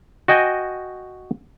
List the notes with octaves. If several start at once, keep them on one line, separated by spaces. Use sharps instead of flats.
F#4 D#5 G5 G#5